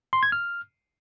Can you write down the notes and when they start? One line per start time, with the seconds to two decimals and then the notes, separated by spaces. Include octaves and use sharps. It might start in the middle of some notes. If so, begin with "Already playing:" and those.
0.13 C6
0.23 G#6
0.32 F6